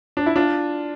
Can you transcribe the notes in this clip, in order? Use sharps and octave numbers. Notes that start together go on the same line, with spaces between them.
D4
E4
D4 F4